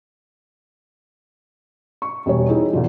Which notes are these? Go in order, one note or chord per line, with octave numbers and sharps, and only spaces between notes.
C#6
E1 G3 C#5
D#4 E4 G#4
E2 D3 F3